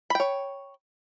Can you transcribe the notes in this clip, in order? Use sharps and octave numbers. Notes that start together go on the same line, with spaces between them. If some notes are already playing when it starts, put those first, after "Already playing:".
C#5 G5 B5